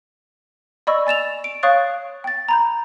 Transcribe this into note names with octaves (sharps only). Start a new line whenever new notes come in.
D5 D#5 B5 C#6 E6
G#5 A6 E7 F7
D7
C#5 F5 C#6 D#6 F#6 A6
G5 A6
A#5 B5 G6